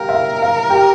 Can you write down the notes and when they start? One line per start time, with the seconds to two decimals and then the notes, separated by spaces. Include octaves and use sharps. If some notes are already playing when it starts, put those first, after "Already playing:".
Already playing: G4 A#4 F5 G5
0.09 E5
0.15 F5
0.42 F5
0.70 G4 G5